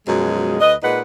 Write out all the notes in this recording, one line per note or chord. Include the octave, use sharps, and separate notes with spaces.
F#2 B2 F3 G#3
D2 B4 D#5
A#2 G#3 D#4 B4 F#5